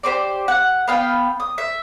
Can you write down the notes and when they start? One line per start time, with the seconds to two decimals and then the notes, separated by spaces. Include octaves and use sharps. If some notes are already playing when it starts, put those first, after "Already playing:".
0.03 G4 G#4 C5 D5
0.48 F#5
0.88 B3 F5 G5
1.40 D#6
1.58 E5